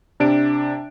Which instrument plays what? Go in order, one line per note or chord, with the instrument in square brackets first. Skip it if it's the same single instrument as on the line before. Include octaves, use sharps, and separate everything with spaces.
[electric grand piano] C3 D4 D7